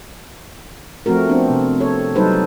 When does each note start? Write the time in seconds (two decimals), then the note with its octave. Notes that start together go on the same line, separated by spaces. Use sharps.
1.06 F3 A3 C4 F#4 A#4
1.29 B3 C4 D4
1.50 C3
1.81 A4 C#5
2.16 F#3 G3 D#4 A4 B4 C5